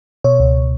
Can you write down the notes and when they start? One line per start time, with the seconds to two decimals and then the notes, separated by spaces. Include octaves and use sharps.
0.24 B2 C#5
0.40 C#2